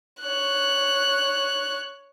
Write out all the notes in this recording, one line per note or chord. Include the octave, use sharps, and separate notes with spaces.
C#5 F#6